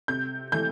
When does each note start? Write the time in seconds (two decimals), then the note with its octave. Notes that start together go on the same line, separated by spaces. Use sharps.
0.08 C3 G6
0.52 E3 A3 G6